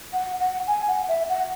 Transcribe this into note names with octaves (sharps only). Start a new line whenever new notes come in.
F#5
F#5
G#5
F#5
E5
F#5